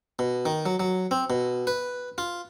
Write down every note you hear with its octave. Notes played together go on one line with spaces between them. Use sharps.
B2
D#3
F#3
F#3
C4
B2
B4
F4